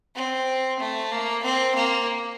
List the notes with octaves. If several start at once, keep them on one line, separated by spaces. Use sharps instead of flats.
C4
A3
A#3
C4
A#3